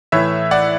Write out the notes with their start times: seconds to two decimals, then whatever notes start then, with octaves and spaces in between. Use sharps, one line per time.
0.12 A2 E3 C#5 E5
0.51 D5 F#5